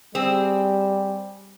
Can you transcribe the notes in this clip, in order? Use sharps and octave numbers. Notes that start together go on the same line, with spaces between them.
G3 C4 G#4